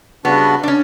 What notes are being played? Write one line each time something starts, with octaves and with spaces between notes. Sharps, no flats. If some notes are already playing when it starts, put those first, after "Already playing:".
C#3 G3 B3 D4 F#4
D4
C#4